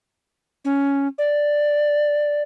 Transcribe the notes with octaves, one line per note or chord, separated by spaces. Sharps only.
C#4
D5